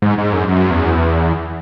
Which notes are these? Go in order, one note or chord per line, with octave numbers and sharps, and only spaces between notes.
G#2
G#2
F#2
F#2
E2